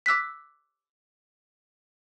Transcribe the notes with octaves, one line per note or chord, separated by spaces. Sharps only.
D6 E6 F#6 B6